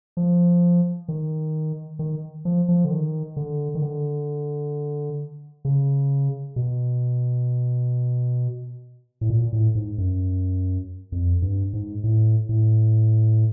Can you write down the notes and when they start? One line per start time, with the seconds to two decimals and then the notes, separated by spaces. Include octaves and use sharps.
0.17 F3
1.08 D#3
1.99 D#3
2.45 F3
2.69 F3
2.85 D3
2.91 D#3
3.37 D3
3.75 D#3
3.82 D3
5.65 C#3
6.56 B2
9.21 A2
9.30 A#2
9.53 A2
9.75 G#2
9.98 F#2
11.12 F2
11.42 G2
11.73 G#2
12.04 A2
12.49 A2